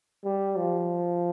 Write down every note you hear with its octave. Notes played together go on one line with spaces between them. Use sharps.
G3
F3